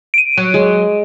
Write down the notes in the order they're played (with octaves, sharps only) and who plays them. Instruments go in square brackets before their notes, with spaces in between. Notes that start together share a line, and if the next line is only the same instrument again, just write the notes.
[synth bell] D7 D#7
[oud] F#3
[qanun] G#3